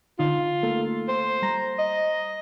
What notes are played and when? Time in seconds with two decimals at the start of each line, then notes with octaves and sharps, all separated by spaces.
0.19 D3 D#4 F4
0.63 A3 A#3 A4
1.08 C5
1.42 G3 A#5 A#6
1.79 D#5